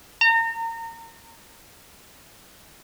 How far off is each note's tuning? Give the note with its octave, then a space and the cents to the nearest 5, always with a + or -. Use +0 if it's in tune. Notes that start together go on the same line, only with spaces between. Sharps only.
A#5 -30